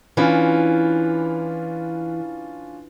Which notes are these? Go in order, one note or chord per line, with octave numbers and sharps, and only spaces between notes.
E3 C#4 D4 F4